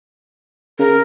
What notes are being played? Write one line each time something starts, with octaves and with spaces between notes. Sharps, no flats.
C#3 A#4